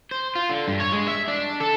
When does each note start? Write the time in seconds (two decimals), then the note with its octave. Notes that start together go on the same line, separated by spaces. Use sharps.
0.11 C5
0.35 F4
0.49 D3
0.68 G2
0.80 C#5
0.92 G#3
1.08 E5
1.28 D4
1.61 A4